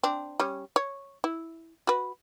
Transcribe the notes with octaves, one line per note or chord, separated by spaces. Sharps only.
C4 D4
G3 C#4 C#5
C#5
E4
F#4 B4